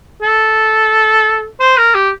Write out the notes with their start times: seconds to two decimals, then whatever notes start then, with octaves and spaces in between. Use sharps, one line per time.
0.22 A4
1.60 C5
1.77 A#4
1.94 G4